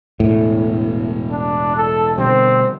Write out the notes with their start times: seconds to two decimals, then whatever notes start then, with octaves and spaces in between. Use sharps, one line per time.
0.20 E1 A2
1.31 D4
1.76 A4
2.18 B2 D3 G3 C4